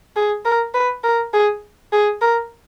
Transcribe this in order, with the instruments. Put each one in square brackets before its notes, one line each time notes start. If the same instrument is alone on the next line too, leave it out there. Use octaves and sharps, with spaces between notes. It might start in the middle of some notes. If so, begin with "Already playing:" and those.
[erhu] G#4
A#4
B4
A#4
G#4
G#4
A#4